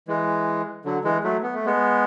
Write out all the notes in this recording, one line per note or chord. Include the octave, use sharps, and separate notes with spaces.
E3 G#3
D3 F#3
E3 G#3
F#3 A3
B3
A3
G#3 B3